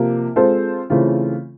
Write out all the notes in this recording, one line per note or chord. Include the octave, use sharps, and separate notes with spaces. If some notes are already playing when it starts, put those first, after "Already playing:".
Already playing: C3 F3 A#3
G#3 C4 F4 A4 C5
C#3 E3 A3 C4 F4